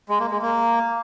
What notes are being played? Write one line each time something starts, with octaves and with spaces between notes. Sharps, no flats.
G#3
A#3
G#3
A#3